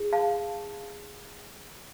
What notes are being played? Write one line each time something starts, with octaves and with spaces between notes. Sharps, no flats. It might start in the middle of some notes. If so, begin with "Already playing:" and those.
Already playing: E4 G#4
F5 A5